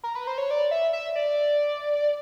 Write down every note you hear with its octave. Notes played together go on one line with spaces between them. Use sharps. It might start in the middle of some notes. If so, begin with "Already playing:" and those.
A#4
B4
C5
C#5
D5
E5
E5
D5